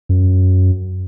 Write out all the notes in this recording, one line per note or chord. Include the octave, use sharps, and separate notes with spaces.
F#2